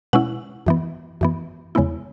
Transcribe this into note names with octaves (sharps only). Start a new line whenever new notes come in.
B2 G#3 C#4 E4 F#5
F#2 E3 B3
F#2 E3 B3
E2 C#3 G#3 B3 E4